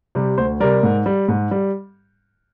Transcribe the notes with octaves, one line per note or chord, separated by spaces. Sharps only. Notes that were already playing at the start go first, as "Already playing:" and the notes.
C3 G3
D2 C5
C3 G3 A#4 D5
G#2
G3
G#2
G3